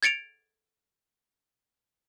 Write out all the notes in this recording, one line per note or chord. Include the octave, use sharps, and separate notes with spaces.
G#6 A6 C#7 D7 F7